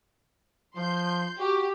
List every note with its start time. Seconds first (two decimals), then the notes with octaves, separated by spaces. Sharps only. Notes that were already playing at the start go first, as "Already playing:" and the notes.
0.76 F3 C6 G6
1.39 F#4 G4